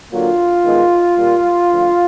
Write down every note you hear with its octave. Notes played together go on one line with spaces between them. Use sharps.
D3 F#3 A#3 F4
D#3 G#3 B3
A#2 G3 A#3
D3 F3 A3